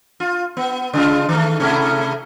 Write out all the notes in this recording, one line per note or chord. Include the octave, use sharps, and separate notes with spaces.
F4
B3
C#3 G#3 F4
D#3 A3
C3 A3 E4